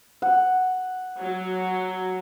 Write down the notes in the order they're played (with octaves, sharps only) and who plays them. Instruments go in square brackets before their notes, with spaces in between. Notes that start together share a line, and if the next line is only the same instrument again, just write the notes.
[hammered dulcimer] F#5
[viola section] F#3